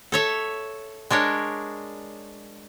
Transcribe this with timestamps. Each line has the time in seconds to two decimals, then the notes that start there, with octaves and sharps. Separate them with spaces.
0.12 A4 C#5 E5
1.10 G#3 D4 A#4 C#5